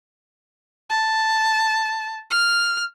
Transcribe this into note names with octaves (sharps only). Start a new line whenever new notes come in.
A5
F6